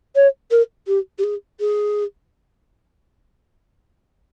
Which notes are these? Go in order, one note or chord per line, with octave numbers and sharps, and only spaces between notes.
C#5
A#4
G4
G4
G#4
G#4